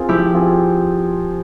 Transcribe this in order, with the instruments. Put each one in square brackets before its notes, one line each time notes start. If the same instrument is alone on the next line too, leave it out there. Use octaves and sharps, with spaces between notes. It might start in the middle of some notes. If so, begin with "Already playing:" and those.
Already playing: [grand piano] C4 F4 G#4 [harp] A#4
[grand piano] F3 [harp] E4 G4
[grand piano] C4 F4 G#4